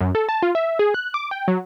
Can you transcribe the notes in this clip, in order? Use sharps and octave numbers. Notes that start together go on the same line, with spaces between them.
F#2
A4
A5
F4
E5
G#4
F#6
D6
G5
F#3